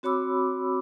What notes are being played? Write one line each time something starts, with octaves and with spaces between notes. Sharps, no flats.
C4 F#4 C#5 B5 D6 E6